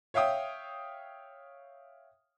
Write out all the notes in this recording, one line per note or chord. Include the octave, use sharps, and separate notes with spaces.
C#5 E5 F5 G5 D#6